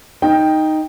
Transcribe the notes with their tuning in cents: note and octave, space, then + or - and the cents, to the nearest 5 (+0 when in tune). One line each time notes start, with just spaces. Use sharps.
D#4 +0 G5 +5